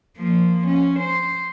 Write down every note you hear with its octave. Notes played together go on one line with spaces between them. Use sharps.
F3 A#3
C#4
C5